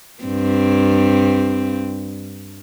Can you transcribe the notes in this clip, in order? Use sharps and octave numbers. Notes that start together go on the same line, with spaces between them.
G2 C4